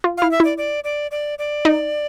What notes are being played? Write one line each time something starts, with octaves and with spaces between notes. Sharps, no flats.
F4
E4 F5
E5
E4 D5
D5
D5
D5
D5
D#4